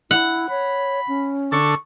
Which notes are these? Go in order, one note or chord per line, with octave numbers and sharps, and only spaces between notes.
E4 F#5
C#5 B5
C#4
D3 A4 C#6